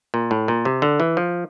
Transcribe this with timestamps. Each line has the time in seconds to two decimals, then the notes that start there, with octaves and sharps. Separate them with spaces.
0.14 A#2
0.31 A2
0.48 A#2
0.65 C3
0.82 D3
1.00 E3
1.17 F3